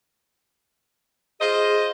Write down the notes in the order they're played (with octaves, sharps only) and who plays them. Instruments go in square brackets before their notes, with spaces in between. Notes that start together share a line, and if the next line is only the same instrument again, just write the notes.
[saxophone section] F4 C5 D#5 [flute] G#4